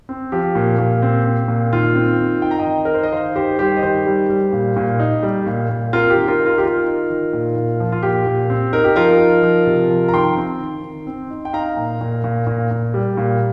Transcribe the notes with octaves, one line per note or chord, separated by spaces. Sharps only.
C4
F3 G4
A#2
A#2
C4
C4
A#2
D#3 F4
C4
D#3
D#4 G5
A#5
D#5 G5
D#3
D#3 A#4
C5
D#5
D#3 C5 F5
D#3 G4 C5
G3 G4 C5
D#5
D#3 G4 C5
G3
G3
A#2
A#2
D#4
G3
A#2
A#2
C4 F4 A#4
G4
D#3
F4 A#4
D#4
F4 A#4
G4
D#3 F4 A#4
D#4
D#3
A#2
A#2
F3
F4
A#2 G4
A#2
C4
D#4 A#4
G4
F3 F4 A#4
D#4
F3
C3
F3
A#5
D#3 G5 C6
C4
D#3
D#3
C4
D#4
G5
D#4 F5 A#5
A#2
A#2
A#2
A#2
A#2
G3
A#2